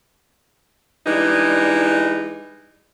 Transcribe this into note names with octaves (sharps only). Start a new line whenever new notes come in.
E3 G3 G#3 D4 D#4